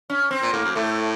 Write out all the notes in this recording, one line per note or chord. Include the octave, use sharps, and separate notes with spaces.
C#4
C4
A#2
A2 A#3
F#2
A2 A3